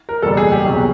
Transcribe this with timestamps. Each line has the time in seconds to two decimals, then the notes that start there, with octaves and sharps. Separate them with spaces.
0.09 A#4
0.22 F#1 E2 B2 G3 A4
0.37 G#4
0.52 G4
0.66 C2 B2 F#3